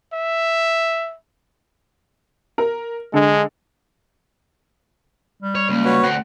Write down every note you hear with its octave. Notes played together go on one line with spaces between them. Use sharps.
E5
A#4
D3 G#3
G3
C#5
C#2 A#3
F#4 B4 C#5
D2 C4 F#5